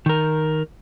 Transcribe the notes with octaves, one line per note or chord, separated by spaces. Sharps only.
D#3 A#4